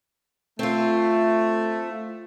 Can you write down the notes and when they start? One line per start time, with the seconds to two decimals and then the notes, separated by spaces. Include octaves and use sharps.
0.59 A3 C4 F4